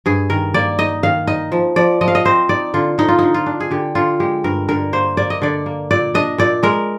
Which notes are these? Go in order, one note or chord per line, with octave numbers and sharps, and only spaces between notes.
G2 G#4
D#3 A#4
A#3 D5
D#4 D#5
D#3 F5
D#4 D#5
F3
F3 D5
F3 D#5
F5
D#5
C4 C5
D#4 D5
D3 F4
D3 D#4
F4
D3 D#4
F4
D4
G#4
D3 G4
D3 F4
G#3 G4
G2 A#4
D3 A#4
A#3 C5
A#3 D5
D#5
D3 D5
A#3
A#2 D5
D4 D#5
A#2 D5
G#3 A#4